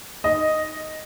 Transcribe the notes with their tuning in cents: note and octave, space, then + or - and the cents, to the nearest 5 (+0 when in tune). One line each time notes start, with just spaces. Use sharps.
D#4 +0 D#5 +0